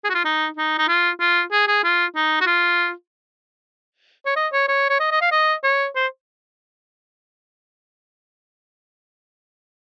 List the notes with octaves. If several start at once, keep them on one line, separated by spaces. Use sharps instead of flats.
G#4
F#4
F4
D#4
D#4
D#4
F4
F4
G#4
G#4
F4
D#4
F#4
F4
C#5
D#5
C#5
C#5
C#5
D#5
D#5
F5
D#5
C#5
C5